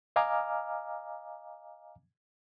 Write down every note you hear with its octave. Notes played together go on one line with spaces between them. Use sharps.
D#5 F5 G#5 A#5 D6 F6